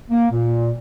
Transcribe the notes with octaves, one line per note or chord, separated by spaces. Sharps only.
A#3
A#2